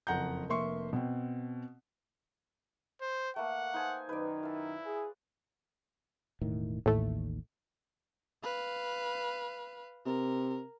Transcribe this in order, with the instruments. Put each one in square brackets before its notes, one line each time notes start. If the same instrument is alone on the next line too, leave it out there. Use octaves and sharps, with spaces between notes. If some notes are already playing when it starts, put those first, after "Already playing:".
[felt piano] F#1 F2 F#5 A#5 G6
F1 A#3 E5 C6 C#6
B2 C4
[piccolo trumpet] C5
[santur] A3 A#3 [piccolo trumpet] F#5
[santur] D#4 C5 G#5
[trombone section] F#2 D#3 D#4 [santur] B4 D5
[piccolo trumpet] E4 [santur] F5 A5
[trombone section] G#4
[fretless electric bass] E1 A2 D#3
[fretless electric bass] A1 D#2 [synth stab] A2 A3
[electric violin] B4 F5
[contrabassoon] C3 [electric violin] A#4